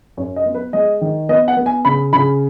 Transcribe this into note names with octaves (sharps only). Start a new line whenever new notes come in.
F#2 C#5
D#5
B3
B4
G#3 D#5
D#3
B3 D#5
F#5
B3
G#5
C#3 B5
C#3 B5